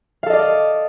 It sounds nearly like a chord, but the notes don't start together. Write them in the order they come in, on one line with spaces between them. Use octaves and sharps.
F5 A4 D#5 D5